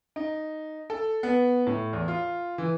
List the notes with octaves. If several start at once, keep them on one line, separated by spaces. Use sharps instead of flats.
D#4
A4
B3
A2
E2
F4
E3